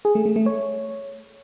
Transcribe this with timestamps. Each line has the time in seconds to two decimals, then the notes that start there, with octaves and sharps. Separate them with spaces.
0.05 G#4
0.15 A3
0.26 A3
0.36 A3
0.46 C#5